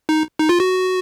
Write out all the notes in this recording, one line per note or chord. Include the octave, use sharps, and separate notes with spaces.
D#4
D#4
F4
F#4